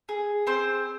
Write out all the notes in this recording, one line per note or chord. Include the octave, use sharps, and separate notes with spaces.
G#4
C4 C5